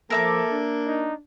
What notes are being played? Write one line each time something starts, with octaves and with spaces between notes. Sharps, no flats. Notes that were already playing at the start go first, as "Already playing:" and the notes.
F3 A#3 A4 A#4 E5 D6
D4
D#4